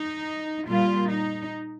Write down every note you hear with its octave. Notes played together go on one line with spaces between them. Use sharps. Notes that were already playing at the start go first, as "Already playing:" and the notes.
Already playing: D#4
A#2 G3 F4
D#4